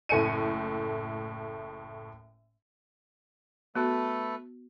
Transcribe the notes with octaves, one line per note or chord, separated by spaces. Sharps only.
F#1 A2 A3 G#5 C#7 D#7
A3 B3 F#4 A4 B4